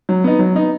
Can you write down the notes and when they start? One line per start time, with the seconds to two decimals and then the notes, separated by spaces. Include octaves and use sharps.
0.09 F#3
0.24 B3 D#4
0.39 F#3
0.55 B3 D#4